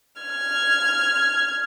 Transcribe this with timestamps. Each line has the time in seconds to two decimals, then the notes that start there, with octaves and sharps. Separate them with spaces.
0.21 F6 G#6